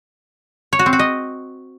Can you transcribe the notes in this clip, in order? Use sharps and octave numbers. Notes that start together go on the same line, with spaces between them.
C#5
F#4
C4
F#4
D#5